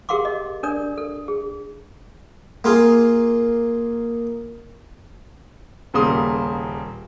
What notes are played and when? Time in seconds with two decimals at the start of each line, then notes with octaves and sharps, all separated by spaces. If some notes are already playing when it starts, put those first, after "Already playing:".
0.09 G4 G#4 A#4 F5 C6 D6
0.25 D#5
0.63 D4 A#4 D5 D#6
0.98 A4
1.28 G#4
2.64 A#3 F4 G#4
5.94 D#1 C#3 G3 A#3 C6 D#6